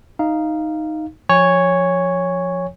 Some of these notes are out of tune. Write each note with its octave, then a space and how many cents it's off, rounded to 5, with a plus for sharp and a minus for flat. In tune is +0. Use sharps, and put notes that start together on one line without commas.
D#4 +0 F5 -10
F3 +10 C#5 +0 G#5 -25